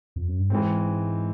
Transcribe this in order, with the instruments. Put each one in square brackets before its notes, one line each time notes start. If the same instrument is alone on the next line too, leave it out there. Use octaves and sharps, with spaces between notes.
[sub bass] F2
F#2
G2
[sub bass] G#2 [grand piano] E3 G#3 C4